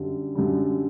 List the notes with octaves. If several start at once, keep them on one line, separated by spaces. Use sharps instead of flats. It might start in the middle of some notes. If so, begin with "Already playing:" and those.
Already playing: F#2 D3 G3
F#2 D3 G3